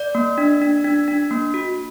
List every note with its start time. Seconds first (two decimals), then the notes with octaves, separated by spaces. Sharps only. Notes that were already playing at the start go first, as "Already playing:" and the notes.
Already playing: D5
0.15 A#3
0.38 D4
0.62 D4
0.84 D4
1.08 D4
1.31 A#3
1.54 F#4